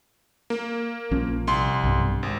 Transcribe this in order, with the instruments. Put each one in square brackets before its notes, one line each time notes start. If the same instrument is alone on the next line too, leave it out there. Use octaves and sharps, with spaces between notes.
[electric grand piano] A#3
[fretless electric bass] A#1 F3 C#4
[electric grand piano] C2 C6
[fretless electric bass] B1 G2
[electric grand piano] G#1